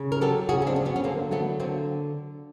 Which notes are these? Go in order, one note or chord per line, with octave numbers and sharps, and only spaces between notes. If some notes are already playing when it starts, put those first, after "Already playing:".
Already playing: C#3
A#4
F#3 G4 A4
C#3 F#4 G#4
C#4
C4 D4
F#3
B3 C#4
C#4
D3 A#3 C4
F#3 A3 B3
D3 A#3 C4